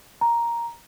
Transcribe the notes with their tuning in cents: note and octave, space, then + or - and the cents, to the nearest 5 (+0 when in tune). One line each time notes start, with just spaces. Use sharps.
A#5 +5